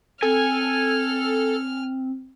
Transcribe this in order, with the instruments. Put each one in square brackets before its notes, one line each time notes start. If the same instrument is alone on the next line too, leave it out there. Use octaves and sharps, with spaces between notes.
[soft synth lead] C4 [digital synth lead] A4 [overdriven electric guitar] G#5 [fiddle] F6